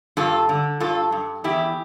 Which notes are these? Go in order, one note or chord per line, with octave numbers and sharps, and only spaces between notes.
G2 F4 A4
D3
G2 F4 A4
G2
E2 E4 G4